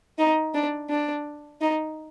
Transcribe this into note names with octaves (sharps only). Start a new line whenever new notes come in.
D#4
D4
D4
D#4